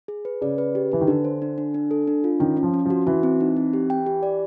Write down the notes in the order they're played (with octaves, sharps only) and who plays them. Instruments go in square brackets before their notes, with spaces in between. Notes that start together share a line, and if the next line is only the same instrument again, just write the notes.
[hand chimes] G#4
B4
[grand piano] C#3 [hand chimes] D5
[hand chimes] B4
G4
[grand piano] E3 [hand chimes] B4
[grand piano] D#3
[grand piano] D3 [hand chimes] D4
[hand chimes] C5
D4
D4
D4
A4
D4
F4
[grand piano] D#3 [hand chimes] C#4
[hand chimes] C#4
[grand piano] F3
[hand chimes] C#4
[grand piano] F3 [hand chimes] F#4
[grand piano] E3 [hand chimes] F#4
[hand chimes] C4
D#4
C4
G4
G5
G4
D5